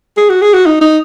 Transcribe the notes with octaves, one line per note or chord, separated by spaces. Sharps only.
G#4
F#4
G#4
F#4
D#4
D#4